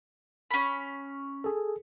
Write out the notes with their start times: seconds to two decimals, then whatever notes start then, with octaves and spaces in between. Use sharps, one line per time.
0.51 C#4 B5
1.44 G#4 A4